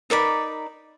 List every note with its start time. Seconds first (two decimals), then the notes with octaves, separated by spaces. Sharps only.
0.10 D#4 A#4 D5 B5